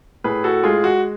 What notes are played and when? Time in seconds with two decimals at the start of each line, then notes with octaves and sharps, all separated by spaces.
0.24 A2 G#4 B4
0.44 F#4 A4
0.63 G#3 F4 G#4
0.84 F#4